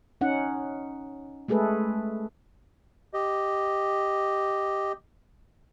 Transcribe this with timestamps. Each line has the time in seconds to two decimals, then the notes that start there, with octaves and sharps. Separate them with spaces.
0.21 C#4 D#4 F#5
1.48 G#3 A3 G#4 A4 B4
3.14 G4 D#5